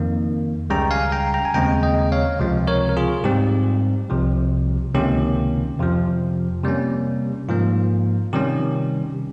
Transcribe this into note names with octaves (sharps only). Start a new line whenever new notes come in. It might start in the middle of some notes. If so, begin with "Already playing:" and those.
Already playing: F2 D#3 A#3
C#2 C#3 G3 G5 A#5
F5 G#5
G5 A#5
G5 A#5
G#5
D#2 C#3 G#3 C4 G5 A#5
D#5 G5
C#5 F5
C#2 C3 F3 C4
A#4 C#5
A#4
F4 G#4
G#2 G3 C4 G4
C2 C3 F3
C#2 C3 D#3 A#3 C#4 G4
F2 C3 F3
C3 G3 A#3 C#4
G#2 F3 A#3 F4
C3 D#3 G3 C#4 G4